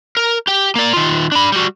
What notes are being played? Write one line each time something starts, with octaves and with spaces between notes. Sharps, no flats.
A#4
G4 G5
A#3 D5
D#3 F4
D4 B5
G3 F#4